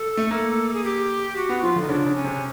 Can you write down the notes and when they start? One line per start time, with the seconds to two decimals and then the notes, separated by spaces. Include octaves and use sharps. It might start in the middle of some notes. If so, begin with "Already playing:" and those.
Already playing: A4
0.17 A3
0.31 A#3
0.73 G#4
0.84 G4
1.36 F#4
1.49 B3
1.62 F3 F4
1.76 D3
1.81 D#4
1.88 C#3 D4
2.06 C#3
2.15 C#4
2.24 C3